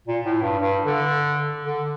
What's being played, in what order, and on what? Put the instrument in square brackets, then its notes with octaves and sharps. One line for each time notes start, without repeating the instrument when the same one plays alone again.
[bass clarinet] A#2
A2
G2
G2
D3
D3